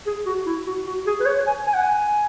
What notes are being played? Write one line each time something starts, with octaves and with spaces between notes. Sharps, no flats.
G#4
F#4
E4
F#4
F#4
G#4
B4
C#5
G#5
G#5
F#5
G#5